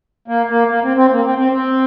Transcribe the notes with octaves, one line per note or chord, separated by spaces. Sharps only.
A#3
A#3
A#3
C4
C4
A#3
C4
C4
C4